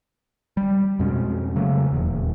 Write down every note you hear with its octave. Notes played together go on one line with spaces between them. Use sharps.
G3
F2 B2 G#3 C#4
C#3 F#3 A3 A#3
D#1 G#1 E2